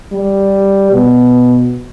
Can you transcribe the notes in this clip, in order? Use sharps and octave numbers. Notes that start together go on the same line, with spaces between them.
G3
B2